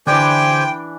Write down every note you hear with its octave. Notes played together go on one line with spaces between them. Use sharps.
D3 E3 D4 G4 C5 G5 G#5